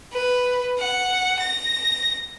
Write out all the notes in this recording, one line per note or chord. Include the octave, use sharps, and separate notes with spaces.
B4
F#5
A#6